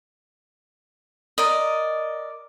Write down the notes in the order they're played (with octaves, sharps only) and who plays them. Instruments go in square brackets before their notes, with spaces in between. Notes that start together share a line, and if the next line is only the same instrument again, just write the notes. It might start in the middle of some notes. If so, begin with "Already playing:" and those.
[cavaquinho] A#4 D5 D#5